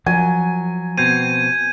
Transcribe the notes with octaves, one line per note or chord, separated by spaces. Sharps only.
F3 F#3 G#5
B2 C4 G6 G#6 D#7